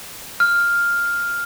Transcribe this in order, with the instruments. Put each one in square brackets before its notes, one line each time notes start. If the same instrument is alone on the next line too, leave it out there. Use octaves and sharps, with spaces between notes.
[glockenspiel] F6